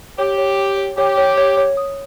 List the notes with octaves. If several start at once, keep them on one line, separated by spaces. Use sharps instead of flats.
G4 C#5
C#5
C#5
C#5
G4 C#5
C#5
C#5
C#5
D#6